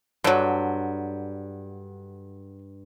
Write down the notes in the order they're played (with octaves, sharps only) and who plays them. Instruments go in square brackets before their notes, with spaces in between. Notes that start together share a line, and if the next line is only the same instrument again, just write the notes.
[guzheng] G2 [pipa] D3 F#3